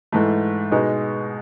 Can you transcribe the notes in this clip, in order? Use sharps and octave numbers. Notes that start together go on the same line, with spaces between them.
G#2 E3 A3
B2 G#3 D#4